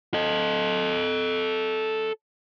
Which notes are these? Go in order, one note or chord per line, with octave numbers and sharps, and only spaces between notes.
A4 D#5